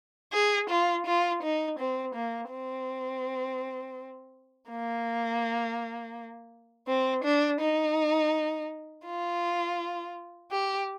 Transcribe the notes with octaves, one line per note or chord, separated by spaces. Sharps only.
G#4
F4
F4
D#4
C4
A#3
C4
A#3
C4
D4
D#4
F4
G4